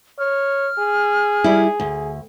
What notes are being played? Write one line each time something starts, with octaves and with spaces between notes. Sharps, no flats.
C#5 F6
G#4
G3 E4
D2